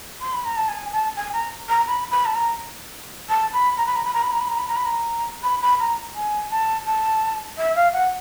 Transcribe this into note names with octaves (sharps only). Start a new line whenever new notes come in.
C6
B5
A#5
A5
G#5
A5
G#5
A#5
A#5
B5
B5
A5
A#5
A5
B5
A#5
B5
A#5
B5
A#5
B5
A#5
B5
A#5
B5
A#5
B5
A#5
B5
B5
A#5
G#5
A5
A5
E5
F5
F#5